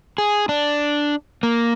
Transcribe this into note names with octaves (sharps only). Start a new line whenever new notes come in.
G#4
D4
A#3